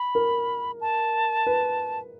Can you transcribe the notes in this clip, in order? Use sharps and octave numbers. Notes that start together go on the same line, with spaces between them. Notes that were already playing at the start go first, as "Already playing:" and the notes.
Already playing: B5
A#4
A5
B4